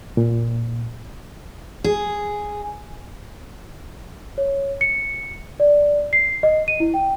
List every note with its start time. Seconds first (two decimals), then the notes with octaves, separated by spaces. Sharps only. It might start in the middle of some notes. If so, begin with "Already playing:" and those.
0.17 A#2
1.84 G#4
4.38 C#5
4.81 C#7
5.60 D5
6.13 C7
6.43 D#5
6.68 D#7
6.80 E4
6.94 G5